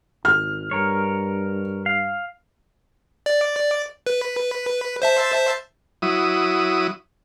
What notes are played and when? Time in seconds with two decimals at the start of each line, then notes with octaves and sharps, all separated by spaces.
0.25 G#1 F6
0.71 G2 A#4 C#5
1.86 F5
3.26 D5
4.07 B4
5.02 C5 E5 A5
6.02 F#3 E4 D#6